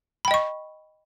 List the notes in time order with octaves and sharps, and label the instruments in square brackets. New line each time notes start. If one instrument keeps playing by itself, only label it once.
[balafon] B5
G5
D#5
C#6